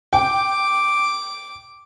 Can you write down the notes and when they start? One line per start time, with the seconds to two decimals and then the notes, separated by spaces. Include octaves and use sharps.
0.13 G5 D6